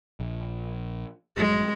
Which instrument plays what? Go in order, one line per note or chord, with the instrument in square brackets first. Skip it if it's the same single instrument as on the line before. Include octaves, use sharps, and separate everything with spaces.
[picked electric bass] A#1
[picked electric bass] A#1 G2 F#3 [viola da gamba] G#3